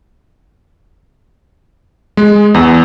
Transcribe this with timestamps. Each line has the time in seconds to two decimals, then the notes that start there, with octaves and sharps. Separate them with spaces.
2.17 G#3
2.54 E2